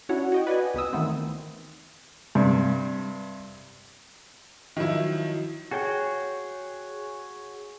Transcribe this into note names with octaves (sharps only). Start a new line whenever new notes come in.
C#4 D4 E4 F#4 C#5 F#5
F#4 D#5 G5
B4 D5 D#5 F#5 G#5
C#2 B3 D#6 E6
D#3 E3 A3 B3 C4
G2 C3
D#3 F3 F#3 E4
F#4 G#4 C#5 G5